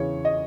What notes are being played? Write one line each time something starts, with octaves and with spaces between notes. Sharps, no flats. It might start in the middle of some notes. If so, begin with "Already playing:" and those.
Already playing: E2 C#3 E3 C#5
D#5